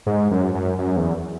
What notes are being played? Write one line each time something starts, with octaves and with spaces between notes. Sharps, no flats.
G#2
F#2
F#2
F#2
E2